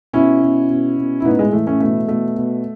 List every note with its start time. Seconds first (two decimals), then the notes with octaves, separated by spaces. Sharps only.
0.13 B2 C#4 E4
0.42 B2
0.69 B2
0.98 B2
1.20 E4
1.25 A2 B3 D#4
1.39 G#3
1.53 E3 A3
1.67 A3 C#4
1.80 B2 A3
2.08 B2 A3
2.36 B2